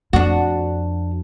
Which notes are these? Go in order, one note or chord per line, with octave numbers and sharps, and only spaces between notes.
F2 D4 F#4